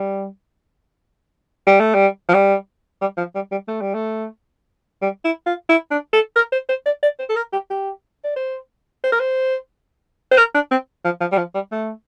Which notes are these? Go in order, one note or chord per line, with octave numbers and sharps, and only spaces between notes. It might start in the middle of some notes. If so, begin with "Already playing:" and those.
Already playing: G3
G3
A3
G3
F3
G3
G3
F3
G3
G3
A3
G3
A3
G3
E4
F4
E4
D4
A4
A#4
C5
C5
D5
D5
C5
A4
A#4
G4
G4
D5
C5
C5
A#4
C5
C5
A#4
D4
C4
F3
F3
G3
F3
G3
A3